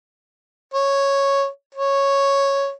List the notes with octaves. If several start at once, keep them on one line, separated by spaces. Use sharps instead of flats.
C#5
C#5